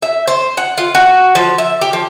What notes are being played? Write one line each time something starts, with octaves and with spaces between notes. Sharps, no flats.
E5
C5
F#5
F4
F#4
F3
E5
G4
F3